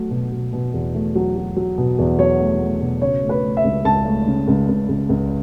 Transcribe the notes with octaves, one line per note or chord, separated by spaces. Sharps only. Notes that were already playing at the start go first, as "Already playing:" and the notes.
Already playing: F#3 A3
B2
B2
B2
E2
A3
F#3
F#3
F#3
B2
E2
F#3 C#5
A3
A3
B2
C#3 C#5
A3
B4
A3
E5
C#2
C#2 A5
A3
C#3
C#2
C#2
C#2
C#2